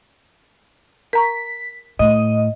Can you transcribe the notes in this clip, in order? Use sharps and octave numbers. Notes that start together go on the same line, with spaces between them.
A#4 A#5 C#6 B6
A2 D#5